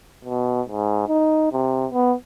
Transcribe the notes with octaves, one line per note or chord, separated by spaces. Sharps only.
B2
G#2
D#4
C3
B3